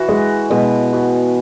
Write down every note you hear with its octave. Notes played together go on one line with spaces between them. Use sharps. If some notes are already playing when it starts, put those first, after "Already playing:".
Already playing: E3 F#4
G#3
B2 G#3
F#4